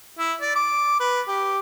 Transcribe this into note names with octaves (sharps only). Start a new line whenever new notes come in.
E4
D5
D6
B4
G4